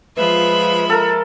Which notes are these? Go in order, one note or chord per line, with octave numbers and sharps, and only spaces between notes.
F3 G#3 F4 B4 E5 B5
A4 A#4